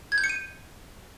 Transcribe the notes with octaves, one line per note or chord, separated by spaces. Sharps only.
G#6
G6
C#7
D#7